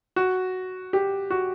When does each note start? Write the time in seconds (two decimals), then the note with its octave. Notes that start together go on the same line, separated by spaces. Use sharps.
0.16 F#4
0.93 G4
1.30 F#4